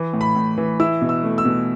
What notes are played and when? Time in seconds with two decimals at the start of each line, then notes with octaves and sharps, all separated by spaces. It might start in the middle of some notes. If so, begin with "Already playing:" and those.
Already playing: E3
0.13 A2
0.21 B5
0.36 A2
0.58 E3
0.80 E4 E6
1.01 B2
1.09 E6
1.23 A3
1.38 E6
1.45 B2